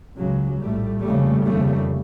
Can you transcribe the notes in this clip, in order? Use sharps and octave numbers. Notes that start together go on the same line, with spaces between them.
C#2 C#3 F#3 G#3
A#1 A2 G3 A3
F1 D#2 C#3 G3 A3
F1 D#2 C#3 G3 A3